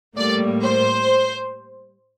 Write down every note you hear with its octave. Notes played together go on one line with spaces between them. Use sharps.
A2 G3 A#3 D5
C5